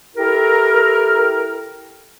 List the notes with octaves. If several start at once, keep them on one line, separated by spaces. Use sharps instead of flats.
E4 G4 A4 A#4